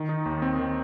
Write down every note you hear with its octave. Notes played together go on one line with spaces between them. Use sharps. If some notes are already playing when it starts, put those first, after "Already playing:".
Already playing: D#3
D#4
D#2
C4
D#3